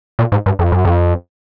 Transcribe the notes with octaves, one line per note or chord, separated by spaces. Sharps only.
A#2
G#2
G2
F2
F#2
F2